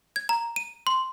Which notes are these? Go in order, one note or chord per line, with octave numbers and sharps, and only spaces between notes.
G#6
A#5
D#7
C6